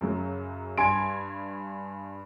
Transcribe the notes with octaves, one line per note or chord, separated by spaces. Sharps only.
F#2 C#3 F#3
G2 G#5 C6 G#6 D7